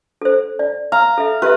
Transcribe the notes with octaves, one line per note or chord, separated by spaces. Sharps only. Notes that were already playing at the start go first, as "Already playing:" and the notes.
A4 C5
D5
F5 A#5
A4 E5
G4 A#4 B4 E5